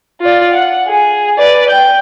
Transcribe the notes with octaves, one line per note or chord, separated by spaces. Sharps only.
F4 D5
F#5
G#4
B4 D5
G5 G6